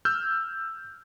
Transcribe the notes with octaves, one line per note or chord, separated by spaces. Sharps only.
E6 F6 G6